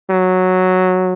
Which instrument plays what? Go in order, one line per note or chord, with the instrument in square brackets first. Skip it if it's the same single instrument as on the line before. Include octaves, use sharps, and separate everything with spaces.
[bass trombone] F#3